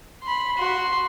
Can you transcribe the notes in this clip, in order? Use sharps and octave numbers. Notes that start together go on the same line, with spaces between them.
B5 C6
F#4 C6